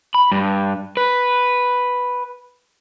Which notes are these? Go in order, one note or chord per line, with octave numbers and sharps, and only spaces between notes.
B5
G2
B4